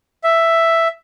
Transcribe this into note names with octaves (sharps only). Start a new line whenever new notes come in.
E5